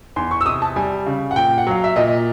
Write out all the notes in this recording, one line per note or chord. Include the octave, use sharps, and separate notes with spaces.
E2 C6
C#6
E6
C3 D#6
A5
G3 G#5
C#3
F#5
A#2 G5
F#5
F#3 F5
E5
A#2 D#5